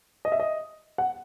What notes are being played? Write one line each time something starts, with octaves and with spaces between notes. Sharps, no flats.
D#5
E5
D#5
F#5